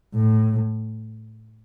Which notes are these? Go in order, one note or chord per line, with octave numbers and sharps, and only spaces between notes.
A2